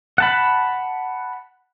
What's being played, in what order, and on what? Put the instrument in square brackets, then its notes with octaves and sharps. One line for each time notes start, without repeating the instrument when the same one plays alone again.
[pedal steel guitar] F#5 A5 B5